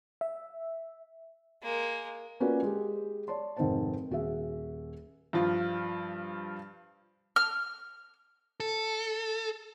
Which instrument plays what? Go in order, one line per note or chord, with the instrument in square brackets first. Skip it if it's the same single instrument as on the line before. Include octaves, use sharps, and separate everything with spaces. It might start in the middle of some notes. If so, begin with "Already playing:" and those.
[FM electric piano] E5
[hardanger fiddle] G#3 A#3
[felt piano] A#3 C#4 F4 F#4 B4 D5
G#3 G4
C#5 D5 A5 C6
F1 G#2 D#3 C4 C5 A5
D#1 F#4 G#4 E5
[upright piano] G2 F3 F4
[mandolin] F6
[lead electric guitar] A4